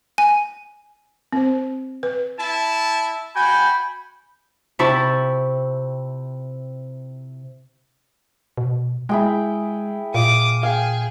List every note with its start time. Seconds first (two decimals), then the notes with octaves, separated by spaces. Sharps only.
0.18 G#5
1.32 C4 C5
2.03 B4
2.38 E4 A5
3.35 F#4 G5 G#5 B5
4.79 C3 E4 A5 C#6
8.57 B2
9.09 G#3 E4 G#4 G5
10.14 A#2 F5 D6 D#6
10.63 G#4 F5 G5